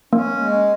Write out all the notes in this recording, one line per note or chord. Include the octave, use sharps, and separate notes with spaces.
A#3 C#4
G#3